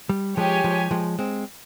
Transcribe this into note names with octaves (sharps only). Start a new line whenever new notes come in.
G3
F3 G#3 G4 C#5 G#5
F3 G#3
F3 G#3
G#3 C4